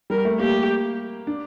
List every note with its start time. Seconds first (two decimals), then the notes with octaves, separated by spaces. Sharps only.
0.10 G3 A#4
0.25 A3
0.39 A#3 G4
1.27 D4